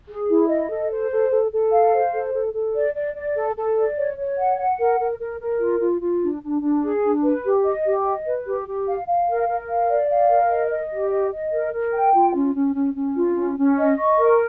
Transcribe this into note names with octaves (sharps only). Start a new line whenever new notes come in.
G#4
E4
D#5
A4
C5
A4
A4
A4
F5
C5
A4
A4
A4
D5
D5
D5
A4
A4
D5
C#5
C#5
F#5
F#5
A#4
A#4
A#4
A#4
F4
F4
F4
D4
D4
D4
G#4
D4
B4
G4
D#5
G4
D#5
B4
G4
G4
F5
F5
A#4
A#4
F5
D5
F5
A#4
D#5
D#5
G4
D#5
D#5
A#4
A#4
G5
F4
C#4
C#4
C#4
C#4
F4
C#4
C#4
D#5
C#6
A#4